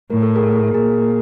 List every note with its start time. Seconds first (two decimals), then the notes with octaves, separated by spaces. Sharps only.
0.10 A2 A#4
0.23 A4
0.36 G#4 A#4
0.74 A#2 G#4 A#4